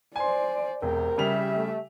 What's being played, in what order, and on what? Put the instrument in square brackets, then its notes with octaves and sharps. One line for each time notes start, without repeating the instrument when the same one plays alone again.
[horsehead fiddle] C5 D5 [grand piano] G#5 C6
[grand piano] E1 [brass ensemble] C3 A#4 [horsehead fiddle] G5
[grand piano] C#3 G3 F7 [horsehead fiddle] G4 E5
[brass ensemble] A3